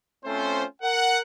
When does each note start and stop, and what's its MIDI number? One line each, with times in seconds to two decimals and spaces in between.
0.24 0.64 57
0.24 0.64 60
0.24 0.64 61
0.24 0.64 65
0.24 0.64 69
0.24 0.64 72
0.82 1.20 70
0.82 1.20 78